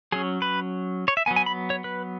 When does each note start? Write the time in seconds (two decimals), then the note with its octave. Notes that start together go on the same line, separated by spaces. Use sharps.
0.12 F#3 C#4 G#4
0.42 B4
1.08 C#5
1.17 E5
1.26 F#3 B3 G#5
1.36 G#5
1.46 B5
1.70 C#5
1.84 B4